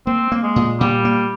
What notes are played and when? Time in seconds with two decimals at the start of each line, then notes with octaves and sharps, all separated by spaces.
0.07 A#3 C4
0.32 A#3
0.43 G#3
0.56 A#2
0.80 A#2 G3
1.05 A#3